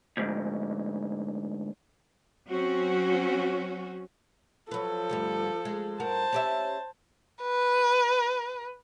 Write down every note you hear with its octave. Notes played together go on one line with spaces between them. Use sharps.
D2 G#2
F#3 C4 C#4 F#4
F3 F#3 A4 B4
D2 G2 G3
G#3
G2 F#4 A#4 C5 A5
C#4 G4 E5
B4